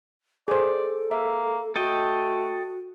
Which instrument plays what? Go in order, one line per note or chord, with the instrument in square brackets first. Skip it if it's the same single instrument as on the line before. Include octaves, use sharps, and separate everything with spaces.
[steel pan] G#4 C5 [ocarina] A4 [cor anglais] D5
[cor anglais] A#3 [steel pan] E5
[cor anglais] A3 [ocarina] F#4 [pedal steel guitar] A4 D#5 G5